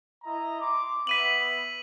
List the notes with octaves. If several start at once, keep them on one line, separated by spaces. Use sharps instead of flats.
E4 D#5 A#5
C6 D6
B3 E5 B6 D#7 F#7